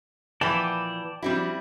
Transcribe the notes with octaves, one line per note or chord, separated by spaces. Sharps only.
A#2 E3 F3 B4 D5 F#5 G5 A5
F3 G3 C4 D4 E4 F#4